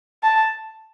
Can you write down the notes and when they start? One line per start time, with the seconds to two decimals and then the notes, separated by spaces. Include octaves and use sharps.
0.23 A5